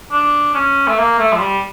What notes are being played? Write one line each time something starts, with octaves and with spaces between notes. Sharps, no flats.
D4
C#4
A3
A#3
A3
F3
G3